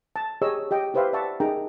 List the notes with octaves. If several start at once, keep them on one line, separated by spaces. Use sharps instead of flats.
A5
G4 G#4 C#5 D#5 A#5 E6
G4 D#5 G5
E4 G4 B4 C5 E5 F5
D5 E5 F#5 A5 C#6
D#4 G#4 A#4 G5 A#5